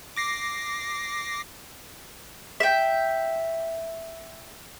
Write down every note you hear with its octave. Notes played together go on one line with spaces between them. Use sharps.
D6 A#6 C7
E5 G5